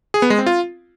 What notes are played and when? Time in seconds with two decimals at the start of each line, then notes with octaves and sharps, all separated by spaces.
0.14 G#4
0.22 B3
0.30 G#3
0.38 C4
0.46 F4